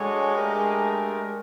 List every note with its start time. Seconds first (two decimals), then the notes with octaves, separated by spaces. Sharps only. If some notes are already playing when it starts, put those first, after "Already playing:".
Already playing: G#3 D4 F#4 A4 C#5
0.35 A3 D4 G4 A#4